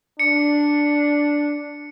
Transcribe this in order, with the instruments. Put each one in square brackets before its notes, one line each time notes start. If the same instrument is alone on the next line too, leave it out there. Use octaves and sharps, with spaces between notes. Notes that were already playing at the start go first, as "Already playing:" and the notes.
[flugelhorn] D4 [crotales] C#7